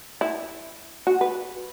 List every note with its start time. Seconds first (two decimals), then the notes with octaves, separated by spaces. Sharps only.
0.21 E4
1.07 F#4
1.21 B4